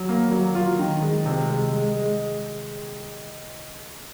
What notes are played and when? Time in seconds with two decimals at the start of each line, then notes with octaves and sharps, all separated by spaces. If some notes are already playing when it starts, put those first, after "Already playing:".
Already playing: F#3
0.09 A#3
0.31 F#3
0.55 F4
0.79 D#3
1.02 G#3
1.26 C3
1.49 G#3
1.73 G#3
1.96 G#3